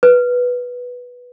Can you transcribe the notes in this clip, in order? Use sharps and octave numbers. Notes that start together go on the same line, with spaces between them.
B4